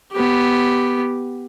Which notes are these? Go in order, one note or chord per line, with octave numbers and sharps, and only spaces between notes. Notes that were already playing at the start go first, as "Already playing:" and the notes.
B3 G4